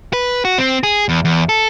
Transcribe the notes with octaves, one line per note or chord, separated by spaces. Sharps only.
B4
F#4
C4
G#4
E2
E2
A4